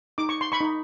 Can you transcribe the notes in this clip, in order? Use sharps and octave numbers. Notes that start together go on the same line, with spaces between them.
D#4 D6
C#6
C6
B5 C#6
D#4